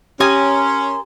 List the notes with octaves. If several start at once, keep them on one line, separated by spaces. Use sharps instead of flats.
C#4 G4 A#4 G#5 C6 D#6